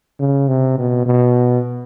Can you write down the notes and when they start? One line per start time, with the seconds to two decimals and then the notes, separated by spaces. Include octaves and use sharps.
0.19 C#3
0.48 C3
0.78 B2
1.06 B2